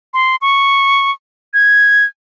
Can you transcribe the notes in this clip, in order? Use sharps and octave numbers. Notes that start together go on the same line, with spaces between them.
C6
C#6
G#6